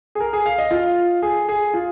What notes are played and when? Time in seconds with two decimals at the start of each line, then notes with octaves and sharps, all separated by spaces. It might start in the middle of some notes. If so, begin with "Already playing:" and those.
0.15 G#4
0.20 A#4
0.33 G#4
0.46 F5
0.58 D#5
0.71 F4
1.22 G#4
1.49 G#4
1.74 F4